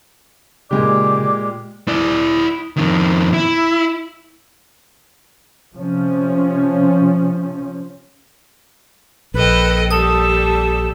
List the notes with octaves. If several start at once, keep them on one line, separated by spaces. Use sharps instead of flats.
A#2 C#3 G#3 G4 D5
E4 D5
F2 D#3
E4
C3 F3 C#4
A#1 A4 B4 D#5 G5
G3 A4 D#6